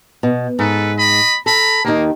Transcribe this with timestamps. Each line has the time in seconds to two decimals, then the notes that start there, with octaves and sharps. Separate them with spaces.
0.23 B2
0.59 G#2 A4 B4
0.96 D#5 B5
1.46 A4 A#5 B5
1.85 D#2 D#3 A#3